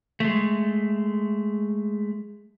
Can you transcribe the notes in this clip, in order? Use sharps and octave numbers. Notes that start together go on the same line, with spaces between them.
G#3 A3